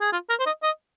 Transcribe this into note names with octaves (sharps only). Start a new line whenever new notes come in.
G#4
F4
A#4
C5
D#5
D#5